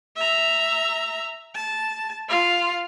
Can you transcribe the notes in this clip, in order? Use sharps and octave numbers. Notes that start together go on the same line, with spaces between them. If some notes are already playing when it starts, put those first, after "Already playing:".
E5 A#5
A5
F4 F5